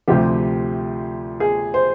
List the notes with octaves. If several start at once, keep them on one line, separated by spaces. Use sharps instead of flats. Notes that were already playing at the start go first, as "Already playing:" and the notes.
D2 C3 F3 G4
G#4
C5